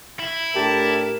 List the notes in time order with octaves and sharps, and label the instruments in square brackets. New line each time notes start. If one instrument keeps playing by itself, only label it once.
[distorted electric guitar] E4
[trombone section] A2 D4 A#4 [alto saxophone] G4 [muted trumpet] A5